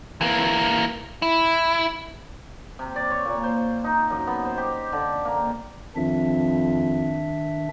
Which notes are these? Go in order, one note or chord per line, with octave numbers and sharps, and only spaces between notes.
E3 A#3
E4
C3
D5
C#5
A#2
C5
D#4
F#2
B3
C5
G4
D3
A#3
F2 D#3 D4 E5